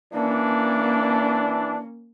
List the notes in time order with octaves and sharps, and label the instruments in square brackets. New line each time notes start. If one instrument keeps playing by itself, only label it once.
[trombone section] E3 D4 [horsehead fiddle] A#3 C#4